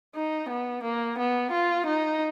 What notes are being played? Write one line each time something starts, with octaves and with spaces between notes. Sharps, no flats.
D#4
B3
A#3
B3
F4
D#4